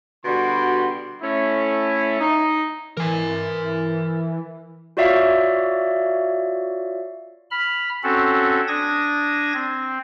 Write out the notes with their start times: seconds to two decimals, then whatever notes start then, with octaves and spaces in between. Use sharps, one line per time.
0.24 B2 D3 G3 F#4 C6
1.22 A3 C#4 E4
2.20 D#4
2.97 E3 A#4 G#5
4.97 F4 F#4 C#5 D5 E5 F5
7.51 B5 F6
8.04 C4 C#4 F#4 A4
8.68 D4 D#6 G#6 A#6
9.54 C4